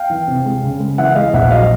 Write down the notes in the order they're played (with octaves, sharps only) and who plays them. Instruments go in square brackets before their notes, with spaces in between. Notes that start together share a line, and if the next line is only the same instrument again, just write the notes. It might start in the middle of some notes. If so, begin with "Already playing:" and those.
Already playing: [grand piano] F5 G5
E3
C3
G#3
C#3
G#3
E3 E5 F#5
G#3 D#5 F5
A#1 E5 F#5
F#3 D#5 F5